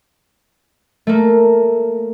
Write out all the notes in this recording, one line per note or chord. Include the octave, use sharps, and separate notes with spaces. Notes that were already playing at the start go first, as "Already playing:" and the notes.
A3 A#3